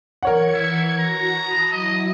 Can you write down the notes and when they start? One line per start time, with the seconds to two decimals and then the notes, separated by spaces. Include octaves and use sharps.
0.23 E3 A#4 C#5 F#5 G#6 C#7
0.54 E4
0.99 F#4 A#5
1.39 A5 B5 D#6
1.72 F#3 E4 D#5